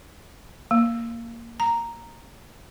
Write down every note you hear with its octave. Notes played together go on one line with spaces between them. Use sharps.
A#3
A#5